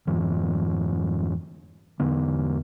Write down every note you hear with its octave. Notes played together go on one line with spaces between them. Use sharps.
F2 G#2 E3
E2 D3 B3